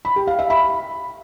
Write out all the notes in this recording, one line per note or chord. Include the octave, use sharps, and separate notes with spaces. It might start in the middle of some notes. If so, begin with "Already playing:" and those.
B5
G4
F5
E5
B5